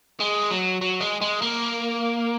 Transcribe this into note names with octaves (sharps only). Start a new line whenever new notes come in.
G#3
F#3
F#3
G#3
G#3
A#3